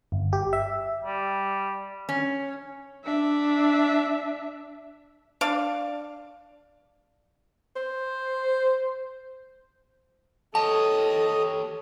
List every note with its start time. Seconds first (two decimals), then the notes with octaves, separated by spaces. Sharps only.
0.12 G1
0.33 G4
0.53 E5
1.04 G3
2.09 C#4
3.05 D4 E5
5.41 D4 D5 F5
7.76 C5
10.55 G4 A4 C#5 D#5 A5 D#6